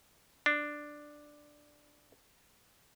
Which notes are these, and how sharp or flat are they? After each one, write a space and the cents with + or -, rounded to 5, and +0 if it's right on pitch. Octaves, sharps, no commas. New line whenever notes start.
D4 +5